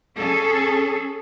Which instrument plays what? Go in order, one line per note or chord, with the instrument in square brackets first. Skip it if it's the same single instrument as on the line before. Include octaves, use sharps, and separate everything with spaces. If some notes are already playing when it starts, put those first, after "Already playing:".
[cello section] C#4 G#4 A4